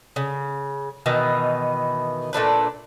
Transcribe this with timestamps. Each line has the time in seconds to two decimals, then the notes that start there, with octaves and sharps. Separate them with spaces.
0.16 C#3
1.06 B2 D#3 E3
2.33 A#2 A3 D4 B4